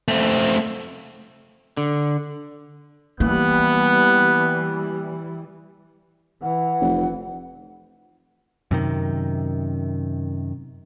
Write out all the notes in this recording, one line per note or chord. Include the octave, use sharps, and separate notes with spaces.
A3 C4
D3
E3 G3 A#3 B3 F#6
E3 F#5
F1
F#2 C3 D#3